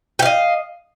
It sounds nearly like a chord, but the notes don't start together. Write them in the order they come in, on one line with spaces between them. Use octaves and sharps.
G5 F5 D#5